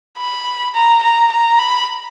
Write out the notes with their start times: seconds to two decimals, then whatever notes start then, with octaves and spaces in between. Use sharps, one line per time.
0.18 B5
0.74 A#5
1.02 A#5
1.32 A#5
1.59 B5